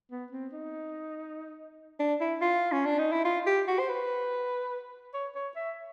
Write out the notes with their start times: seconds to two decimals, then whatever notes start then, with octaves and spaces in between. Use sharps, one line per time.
0.11 B3
0.32 C4
0.53 D#4
1.99 D4
2.21 E4
2.42 F4
2.72 C#4
2.86 D4
2.99 D#4
3.12 E4
3.25 F4
3.47 G4
3.68 F#4
3.79 C5
3.89 B4
5.14 C#5
5.35 C#5
5.56 E5